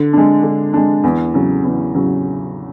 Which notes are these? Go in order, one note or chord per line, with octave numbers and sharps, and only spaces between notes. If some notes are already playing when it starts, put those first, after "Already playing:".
Already playing: D3
G#3 D4
D3
G#3 D4
E2
C#3 F#3
E2
C#3 F#3